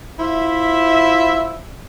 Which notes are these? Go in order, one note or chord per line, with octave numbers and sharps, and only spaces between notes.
E4 F4 C5 E5